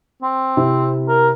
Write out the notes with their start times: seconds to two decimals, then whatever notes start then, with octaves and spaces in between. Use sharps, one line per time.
0.22 C4
0.57 C3 E4
1.08 A#4